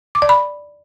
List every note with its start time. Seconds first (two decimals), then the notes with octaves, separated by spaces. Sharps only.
0.15 D6
0.22 D5
0.29 B5